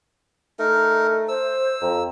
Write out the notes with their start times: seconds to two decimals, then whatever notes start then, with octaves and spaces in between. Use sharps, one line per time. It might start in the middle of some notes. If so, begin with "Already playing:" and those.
0.59 A3 D#4 A#4
1.29 C5 E6
1.82 F2 A#5